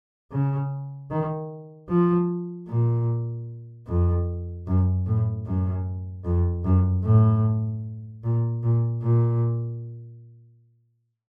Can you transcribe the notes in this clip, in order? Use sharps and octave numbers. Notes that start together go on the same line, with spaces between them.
C#3
D#3
F3
A#2
F2
F#2
A2
F#2
F2
F#2
A2
A#2
A#2
A#2